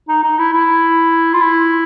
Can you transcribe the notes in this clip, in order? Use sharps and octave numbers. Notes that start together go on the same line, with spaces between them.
D#4
D#4
E4
E4
F4
E4